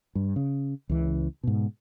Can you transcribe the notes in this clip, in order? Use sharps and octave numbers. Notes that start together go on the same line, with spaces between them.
G2
C#3
C#2 C#3 E3
G#2 B2